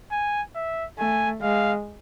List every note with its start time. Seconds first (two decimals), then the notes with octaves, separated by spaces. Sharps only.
0.12 G#5
0.55 E5
0.98 A3 G#5
1.41 G#3 F5